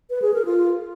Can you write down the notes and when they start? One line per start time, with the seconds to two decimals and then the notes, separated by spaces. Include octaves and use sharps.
0.10 B4
0.22 G#4
0.34 A#4
0.46 F4